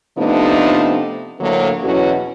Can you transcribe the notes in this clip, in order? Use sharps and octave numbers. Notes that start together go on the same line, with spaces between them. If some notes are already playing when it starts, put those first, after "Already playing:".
C3 F3 A3 B3 D4 D#4
D2 A2 D3 F#3 A#3
E2 B2 E3 F#3 C#4 F#4